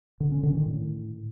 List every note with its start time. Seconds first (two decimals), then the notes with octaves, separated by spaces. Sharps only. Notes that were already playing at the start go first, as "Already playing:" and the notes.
0.20 D3
0.32 C#4
0.43 D3
0.55 D#3
0.66 A2